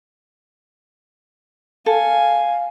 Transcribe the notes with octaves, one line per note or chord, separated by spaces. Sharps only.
A4 F5 G#5